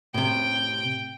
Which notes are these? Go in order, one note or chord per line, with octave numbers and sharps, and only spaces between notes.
A2 C3 G5